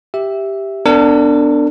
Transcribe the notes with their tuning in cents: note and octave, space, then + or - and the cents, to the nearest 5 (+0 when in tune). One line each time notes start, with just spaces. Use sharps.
G4 +0 E5 +0
B3 +20 D4 +0 A#4 -40